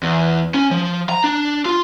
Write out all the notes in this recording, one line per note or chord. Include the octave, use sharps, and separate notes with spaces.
E2
C#4
F3
A#5
D4
F4